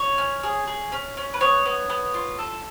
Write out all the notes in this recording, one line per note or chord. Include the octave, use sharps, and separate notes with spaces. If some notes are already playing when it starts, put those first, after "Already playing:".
Already playing: C#5
C#4
G#4
G#4
C#4
C#4
B4
B3 C#5
B3
B3
F4
A4